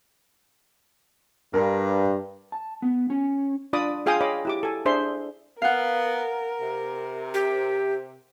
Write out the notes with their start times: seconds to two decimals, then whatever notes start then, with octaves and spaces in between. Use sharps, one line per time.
1.54 G2 A#4
2.52 A5
2.82 B3
3.10 C#4
3.73 D4 F4 D5 B5 D6 D#6
4.06 F4 G#4 F5 G5 G#5 D#6
4.21 C#5 D#5 F5 B5 D6
4.45 E4 G4 D6
4.63 A4 G#5
4.85 D4 G#4 C5 E5 C6
5.62 B3 A#4 F5 F#5
6.61 C3
7.34 G4